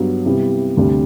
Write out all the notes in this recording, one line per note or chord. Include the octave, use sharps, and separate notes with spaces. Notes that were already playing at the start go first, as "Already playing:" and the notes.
Already playing: G2 F#3 B3
C3 G3 B3 E4
D2 C3 G3